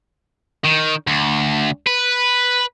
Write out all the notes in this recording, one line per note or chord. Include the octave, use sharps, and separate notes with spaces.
D#3
D2
B4